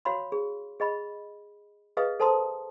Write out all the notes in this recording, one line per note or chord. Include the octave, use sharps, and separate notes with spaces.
F#4 C#5 F5 B5 C6
G#4
G#4 D#5 B5
G#4 B4 D#5 F5 D#6
A4 C5 A5 A#5 C6 D#6